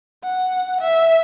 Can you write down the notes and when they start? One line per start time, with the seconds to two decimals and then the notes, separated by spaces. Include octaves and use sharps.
0.24 F#5
0.81 E5